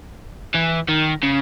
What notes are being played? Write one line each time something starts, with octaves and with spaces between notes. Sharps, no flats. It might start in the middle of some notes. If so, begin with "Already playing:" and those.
E3
D#3
C#3